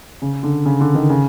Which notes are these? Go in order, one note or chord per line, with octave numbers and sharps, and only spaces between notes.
C#3
D3
C#3
D3
D#3
C#3